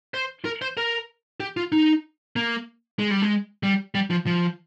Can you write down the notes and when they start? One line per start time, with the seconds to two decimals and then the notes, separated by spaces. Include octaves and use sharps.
0.14 C5
0.45 A#4
0.62 C5
0.77 A#4
1.40 G4
1.57 F4
1.72 D#4
2.36 A#3
2.99 G#3
3.11 G3
3.22 G#3
3.63 G3
3.95 G3
4.10 F3
4.26 F3